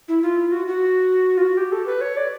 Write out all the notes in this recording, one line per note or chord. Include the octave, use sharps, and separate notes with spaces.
E4
F4
F#4
F#4
F4
F#4
G4
A4
B4
C#5
D5